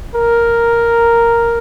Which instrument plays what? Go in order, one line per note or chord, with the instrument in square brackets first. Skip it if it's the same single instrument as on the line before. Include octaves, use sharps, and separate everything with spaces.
[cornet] A#4